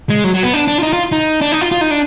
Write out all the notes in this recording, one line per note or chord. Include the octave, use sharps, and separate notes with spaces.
G#3
F#3
F#3
B3
D4
D4
F4
D#4
F4
D#4
D4
D#4
F4
F4
D#4
D4